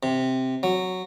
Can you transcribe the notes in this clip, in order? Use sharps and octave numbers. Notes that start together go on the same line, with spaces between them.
C3
F#3